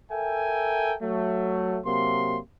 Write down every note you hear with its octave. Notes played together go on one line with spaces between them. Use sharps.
A4 A#4 E5 G5 G#5
F#3 A3
C3 F#3 A#3 C6